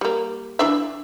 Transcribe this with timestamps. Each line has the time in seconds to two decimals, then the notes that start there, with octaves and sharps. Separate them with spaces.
0.01 G3 A#3
0.59 E3 D4 E5